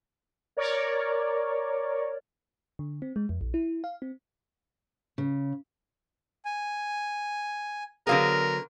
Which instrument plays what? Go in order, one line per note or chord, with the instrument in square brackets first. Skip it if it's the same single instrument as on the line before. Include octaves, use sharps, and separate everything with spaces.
[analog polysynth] A#4 C#5 D5
[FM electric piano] D3
C4
G#3
F2
A#1
E4
F5
C4
[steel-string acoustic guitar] C#3
[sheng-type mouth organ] G#5
[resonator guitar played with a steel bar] D3 F#3 B3 [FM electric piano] G#4 F5 [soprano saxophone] A#4